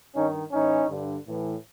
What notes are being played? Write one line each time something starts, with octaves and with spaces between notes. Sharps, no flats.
G2 D#3 C#4 D#4
A2 E3 C#4 D#4
G2 D3
A2 E3